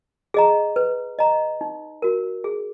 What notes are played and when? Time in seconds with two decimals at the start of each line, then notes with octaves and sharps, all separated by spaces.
0.34 G#4 D#5 A#5
0.76 B4
1.19 D#5 A#5
1.61 D#4
2.02 F#4 A#4
2.44 G#4